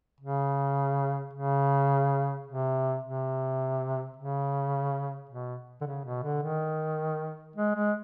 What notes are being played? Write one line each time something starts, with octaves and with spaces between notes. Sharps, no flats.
C#3
C#3
C3
C3
C#3
B2
D3
C#3
B2
D3
D#3
G#3
G#3